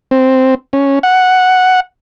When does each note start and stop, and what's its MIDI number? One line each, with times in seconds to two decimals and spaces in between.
0.11 0.55 60
0.73 0.99 61
1.03 1.80 78